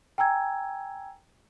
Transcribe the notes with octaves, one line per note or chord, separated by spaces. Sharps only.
G5 G#5 A#5 E6 G#6